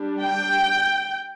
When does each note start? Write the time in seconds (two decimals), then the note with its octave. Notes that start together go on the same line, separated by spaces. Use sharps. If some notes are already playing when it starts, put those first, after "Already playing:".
Already playing: G3 D4
0.22 G5